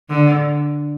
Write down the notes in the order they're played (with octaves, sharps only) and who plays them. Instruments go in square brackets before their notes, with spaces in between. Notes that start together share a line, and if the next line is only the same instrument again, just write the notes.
[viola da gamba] D3